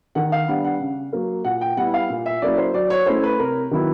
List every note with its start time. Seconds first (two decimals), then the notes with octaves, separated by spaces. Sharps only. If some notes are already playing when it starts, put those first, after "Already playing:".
0.15 D#3 F#5
0.32 F5
0.48 G3 B3 D4 F#5
0.64 F#5
0.80 C#3
1.13 F#3 A#3
1.44 A#2 F#5
1.61 G5
1.77 G3 B3 E4 F#5
1.94 F5
2.10 A#2
2.26 E5
2.42 F#3 A#3 C#4 E4 D5
2.58 C5
2.74 F#3 D5
2.90 C#5
3.06 A3 C#4 E4 C5
3.24 B4
3.39 C3 A#4
3.71 D#3 F#3 B3 E4